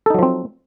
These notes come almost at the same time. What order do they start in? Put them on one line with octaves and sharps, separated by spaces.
A4 D#4 F#3 F3 C4